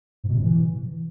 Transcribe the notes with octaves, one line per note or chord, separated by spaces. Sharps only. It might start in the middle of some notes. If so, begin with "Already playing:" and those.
G#2
B2
C3
A2
E3